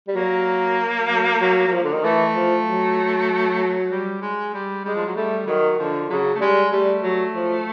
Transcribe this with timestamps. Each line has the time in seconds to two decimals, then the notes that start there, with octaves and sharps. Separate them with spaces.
0.08 G3
0.16 F#3 A#3
1.10 F#3
1.41 F#3
1.68 F#3
1.72 F3
1.83 D3
1.94 D#3
2.04 E3 A3
2.34 F3
2.66 F#3
3.92 G3
4.22 G#3
4.54 G3
4.85 G3 G#3
4.96 F3
5.06 F#3
5.16 G3 A3
5.47 D#3 F#3
5.79 D3 F3
6.10 C#3 F#3
6.35 A3
6.41 G3 G#3
6.72 G3 A3
7.03 F#3
7.35 F3